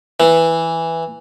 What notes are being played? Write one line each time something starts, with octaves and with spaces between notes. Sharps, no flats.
E3